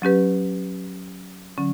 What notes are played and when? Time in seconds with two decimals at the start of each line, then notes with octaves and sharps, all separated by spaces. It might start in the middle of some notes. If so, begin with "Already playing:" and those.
0.02 F#3 C#4 G4 B4
1.58 D3 F#3 C#4